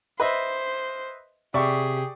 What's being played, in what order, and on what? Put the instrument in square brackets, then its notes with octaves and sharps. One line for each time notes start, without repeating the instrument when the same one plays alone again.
[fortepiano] B4 D#5 E5 [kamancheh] C5
[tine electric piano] C3 [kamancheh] G4 G#4 [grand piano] D5 C#6 [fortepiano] E5